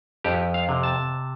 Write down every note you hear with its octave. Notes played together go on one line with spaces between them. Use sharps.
F2 G4
F5
C3
A5